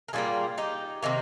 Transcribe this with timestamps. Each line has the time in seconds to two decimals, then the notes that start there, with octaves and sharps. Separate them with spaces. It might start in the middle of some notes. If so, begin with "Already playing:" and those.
0.08 A#4
0.13 A#2 G3 A#3 F4 G#4
0.58 D#4 G4
1.03 C3 D#3 A#3